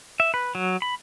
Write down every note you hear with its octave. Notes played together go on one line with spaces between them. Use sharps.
E5
B4
F#3
B5